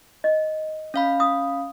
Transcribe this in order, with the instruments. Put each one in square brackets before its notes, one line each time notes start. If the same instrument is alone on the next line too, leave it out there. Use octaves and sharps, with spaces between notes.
[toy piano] D#5
[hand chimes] C#4 F5 B5
[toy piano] D#6